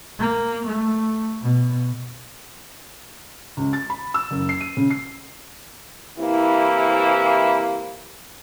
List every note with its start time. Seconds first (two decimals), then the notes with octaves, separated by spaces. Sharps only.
0.19 A#3
0.66 A3
1.42 B2
3.57 C#2
3.73 A6
3.90 B5
4.14 E6
4.31 F#1
4.49 C7
4.61 D#7
4.77 C#3
4.90 C7
6.18 C3 E3 A#3 E4